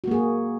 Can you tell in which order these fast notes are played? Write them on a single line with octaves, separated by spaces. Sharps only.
F#4 A#3 G#4